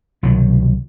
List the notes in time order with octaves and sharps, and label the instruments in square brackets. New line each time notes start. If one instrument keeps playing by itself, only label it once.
[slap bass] C2 B2 D#3 F#3